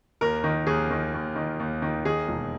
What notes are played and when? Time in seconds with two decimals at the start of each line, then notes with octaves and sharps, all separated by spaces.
0.21 D#2 A#4
0.44 D#3
0.67 D#2 G#4
0.90 D#3
1.14 D#2
1.36 D#3
1.60 D#2
1.82 D#3
2.05 D#3 G#4
2.28 E1